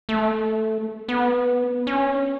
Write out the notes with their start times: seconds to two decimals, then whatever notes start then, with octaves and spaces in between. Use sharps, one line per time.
0.09 A3
1.08 B3
1.87 C#4